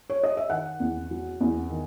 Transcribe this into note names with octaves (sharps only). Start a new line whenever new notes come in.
C#5
D#5
E5
D#3 F#5
E2
F#3
E2
D#3